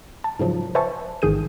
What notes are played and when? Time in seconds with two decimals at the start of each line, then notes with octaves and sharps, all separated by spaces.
0.24 A5
0.39 G#2 C#3 F3 F#3
0.75 B4 C5 E5 G#5 A5 C#6
1.22 A1 G#2 D#3 G#4 G6 D#7